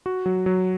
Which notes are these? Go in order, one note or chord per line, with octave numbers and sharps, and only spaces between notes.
F#4
F#3
F#3